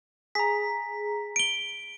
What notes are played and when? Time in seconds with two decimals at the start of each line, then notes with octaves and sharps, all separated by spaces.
0.35 G#4 A#5 B6
1.36 D7 G7